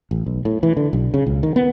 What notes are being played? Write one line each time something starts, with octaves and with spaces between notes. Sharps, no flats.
A1
B1
A2
E3
D3
B1
C#3
C#2
D#3
B3